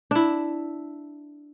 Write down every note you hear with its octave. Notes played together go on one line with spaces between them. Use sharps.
D4 E4